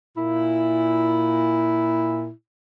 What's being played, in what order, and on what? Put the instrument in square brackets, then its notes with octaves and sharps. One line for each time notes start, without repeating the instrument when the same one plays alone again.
[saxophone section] A#2 E4